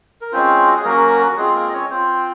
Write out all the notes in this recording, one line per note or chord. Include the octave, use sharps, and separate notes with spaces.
A#4
G#3 C4 C#4 F4 C5
F#4
G#4
F#3 A#3 C#4 F#4 A#4
F#4
G#3 C4 F4 G#4
A#3 A#4
D#5
C#4 C#5
C4 F4 C5